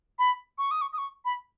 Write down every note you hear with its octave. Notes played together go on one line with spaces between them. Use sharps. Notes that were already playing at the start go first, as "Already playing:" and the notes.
B5
C#6
D#6
C#6
D#6
C#6
B5